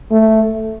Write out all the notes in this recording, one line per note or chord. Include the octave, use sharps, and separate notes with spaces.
A3